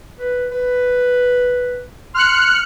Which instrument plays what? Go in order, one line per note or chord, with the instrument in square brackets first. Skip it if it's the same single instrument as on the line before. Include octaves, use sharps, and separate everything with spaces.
[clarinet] B4
B4
[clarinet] C6 [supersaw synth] F6 F#6 C#7